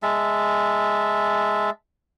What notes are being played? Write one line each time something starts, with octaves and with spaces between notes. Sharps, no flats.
G#3 E5 A5